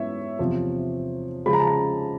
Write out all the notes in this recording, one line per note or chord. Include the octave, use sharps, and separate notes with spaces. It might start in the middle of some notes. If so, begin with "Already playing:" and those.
Already playing: G#2 E3 B3 C#5 E5
E2 C3 F3
C#3 F3 G#3 B5
A#5
A5
A#5